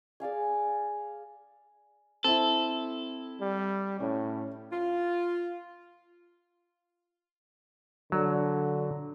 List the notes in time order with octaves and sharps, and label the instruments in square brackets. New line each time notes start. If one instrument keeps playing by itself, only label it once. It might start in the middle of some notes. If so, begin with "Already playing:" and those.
[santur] G#4 D5 F5 G#5
[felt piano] C4 E4 [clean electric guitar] A4
[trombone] G3
[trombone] A2 [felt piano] C#4
[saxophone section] F4
[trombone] D3 [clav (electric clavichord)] F#3